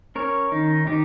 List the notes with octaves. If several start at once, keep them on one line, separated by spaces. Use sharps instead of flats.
C#4 A#4 C#5
D#3 D#4
D#3 D#4 G4